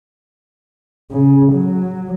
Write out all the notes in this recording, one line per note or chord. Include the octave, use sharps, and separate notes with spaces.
C#3
F#3